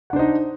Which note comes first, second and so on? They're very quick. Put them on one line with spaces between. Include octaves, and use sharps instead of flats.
F#5 D4 C5 D#4